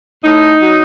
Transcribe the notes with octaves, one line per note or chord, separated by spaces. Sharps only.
A2 D#4
F#3